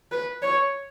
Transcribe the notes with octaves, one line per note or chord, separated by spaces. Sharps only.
B4
C#5